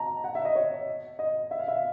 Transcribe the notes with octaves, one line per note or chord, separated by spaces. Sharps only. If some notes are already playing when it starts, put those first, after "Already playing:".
Already playing: A5 A#5
F#5
E5
D#5
C#5
D#5
E5
F5
E5